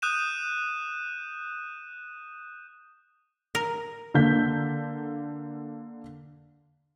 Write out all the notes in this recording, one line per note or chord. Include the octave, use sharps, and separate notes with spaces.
D#6 F#6 G6 D#7 E7
A#4
D3 A#3 G6 B6